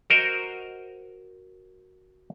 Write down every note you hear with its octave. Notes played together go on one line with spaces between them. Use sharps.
F#4 A#4 C5 D#5